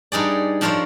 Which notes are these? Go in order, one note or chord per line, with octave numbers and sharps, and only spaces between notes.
G2 D#4 G#4 D5
F3 D4 A#4 C5 C#5